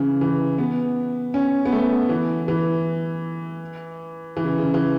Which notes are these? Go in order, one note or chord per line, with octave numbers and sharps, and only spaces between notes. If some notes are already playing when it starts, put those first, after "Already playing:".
Already playing: C#3 E3
E3
B3
C#4
B3
A3
E3
E3
E3
C#3
C#3
E3